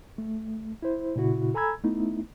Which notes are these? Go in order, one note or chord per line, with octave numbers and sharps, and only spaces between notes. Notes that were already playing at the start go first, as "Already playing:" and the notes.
A3
E4 C5
A#2 C#3 E4 F#4
A4 G#5 A#5 B5 E6 G#6
A3 B3 D#4 E4